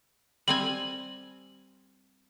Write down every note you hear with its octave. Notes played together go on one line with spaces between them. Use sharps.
G3 C4 G#5 F#7